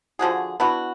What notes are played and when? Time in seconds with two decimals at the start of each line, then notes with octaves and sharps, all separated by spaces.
0.19 D3 F3 F#4 G#4
0.60 B3 D4 E4 F#4